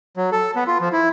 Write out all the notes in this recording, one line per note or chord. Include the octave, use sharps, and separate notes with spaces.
F#3
A4
B3
F4
F3
E4